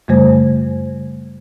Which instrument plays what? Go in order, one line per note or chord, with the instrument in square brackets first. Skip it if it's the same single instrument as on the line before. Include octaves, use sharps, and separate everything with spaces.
[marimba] F#2 C#3 G3 A3 C5